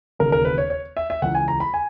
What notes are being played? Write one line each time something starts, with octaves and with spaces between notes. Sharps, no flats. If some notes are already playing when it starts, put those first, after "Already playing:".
E1 D#2 C#3 A#4
A#4
B4
C#5
C#5
E5
E5
C#2 C#3 E3 F#5
G#5
A#5
B5
G#5